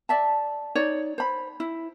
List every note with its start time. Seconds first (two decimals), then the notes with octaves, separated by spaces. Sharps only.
0.09 D5 E5 A5
0.75 D#4 C#5 D5
1.18 C5 B5
1.60 E4